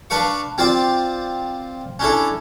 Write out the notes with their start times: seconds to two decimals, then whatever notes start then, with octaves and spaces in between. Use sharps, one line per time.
0.10 D4 B4 F5 C#6
0.58 C4 F4 C5 D5
1.99 C#4 D4 E4 A4